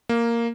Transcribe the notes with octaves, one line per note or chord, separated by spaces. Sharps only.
A#3